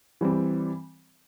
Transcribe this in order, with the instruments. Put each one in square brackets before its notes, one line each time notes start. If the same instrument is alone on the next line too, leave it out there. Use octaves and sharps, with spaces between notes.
[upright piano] E3 G3 C4